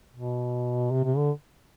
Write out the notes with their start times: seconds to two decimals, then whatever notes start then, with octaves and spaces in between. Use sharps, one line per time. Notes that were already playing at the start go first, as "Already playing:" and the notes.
0.14 B2
0.91 C3
1.04 C3
1.17 D3